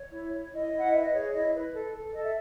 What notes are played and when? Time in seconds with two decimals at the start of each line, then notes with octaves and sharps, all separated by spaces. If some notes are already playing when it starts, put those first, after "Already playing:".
Already playing: C#5
0.12 E4
0.33 C#5
0.52 E4 D#5
0.73 E4
0.79 F#5
0.91 B4 E5
1.01 D#5
1.13 G#4 C#5
1.34 E4 D#5
1.54 B4
1.74 A4
1.94 A4
2.13 A4 D#5
2.23 E5